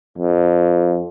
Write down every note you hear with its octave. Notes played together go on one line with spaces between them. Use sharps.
F2